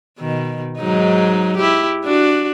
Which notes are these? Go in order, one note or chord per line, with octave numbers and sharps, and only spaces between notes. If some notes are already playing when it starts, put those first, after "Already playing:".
B2 D#3
G#2 F#3 D#4
E4 G4
D4 F#4